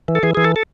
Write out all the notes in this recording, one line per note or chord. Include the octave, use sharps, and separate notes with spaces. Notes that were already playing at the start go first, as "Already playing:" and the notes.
E3
A4
E3 G#4
E3 G#4
A4
A4